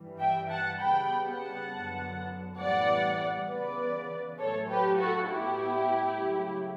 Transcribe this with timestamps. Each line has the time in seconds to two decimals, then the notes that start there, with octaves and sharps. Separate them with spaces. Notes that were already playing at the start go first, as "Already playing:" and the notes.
Already playing: G2 E3 G3
0.19 E5 G5
0.49 F#5 A5
0.79 C#3 G3 B3 G5 B5
1.25 F#5 A5
1.69 F#2 D3 F#3 B3
2.59 A2 E3 G3 B3 D5 F#5
3.48 C#3 E3 B3 B4 D5
4.39 A2 F#3 A3 A4 C#5
4.69 G4 B4
4.98 F#4 A4
5.28 A2 G3 B3 E4 G4
6.19 C#3 F#3 A3